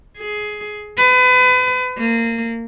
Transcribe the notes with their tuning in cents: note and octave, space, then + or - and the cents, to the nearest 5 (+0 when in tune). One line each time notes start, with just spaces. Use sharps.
G#4 +15
B4 +35
A#3 -20